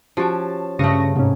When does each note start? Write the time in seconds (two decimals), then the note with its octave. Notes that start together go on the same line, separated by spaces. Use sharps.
0.17 F3 C#4 F#4 G4 A5 D7
0.79 G2 C#3 A3 F5 C#6 D#6 A#6
1.15 G#2 C3 C#4